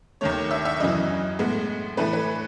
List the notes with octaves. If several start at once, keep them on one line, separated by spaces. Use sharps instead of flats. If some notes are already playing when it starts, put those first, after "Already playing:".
D#2 D#3 A3 C#5
E5
E5
F#2 C#3 E3 D#5
A2 G#3 B3
A2 E3 A3 B4
B4